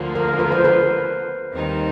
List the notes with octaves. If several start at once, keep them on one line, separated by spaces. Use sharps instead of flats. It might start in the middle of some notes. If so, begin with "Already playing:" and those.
Already playing: D2 D3 F3 A#3
A#4
B4
C5
B4
D#2 D#3 G3 C4 D#4